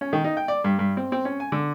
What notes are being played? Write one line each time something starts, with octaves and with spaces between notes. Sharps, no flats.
C#4
D#3
D#4
G5
D5
G2
G2
C4
C4
C#4
G#5
D3